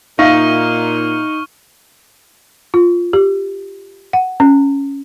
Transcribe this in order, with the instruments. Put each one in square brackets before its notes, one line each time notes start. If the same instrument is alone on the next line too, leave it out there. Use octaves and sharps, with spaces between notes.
[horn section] A#2 [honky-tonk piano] D#4 [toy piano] E5 F5 [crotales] C#6 F6
[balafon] F4
G4
F#5
C#4